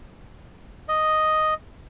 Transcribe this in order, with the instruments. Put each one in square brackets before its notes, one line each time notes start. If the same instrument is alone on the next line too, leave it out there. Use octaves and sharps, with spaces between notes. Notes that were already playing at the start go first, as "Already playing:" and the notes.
[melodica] D#5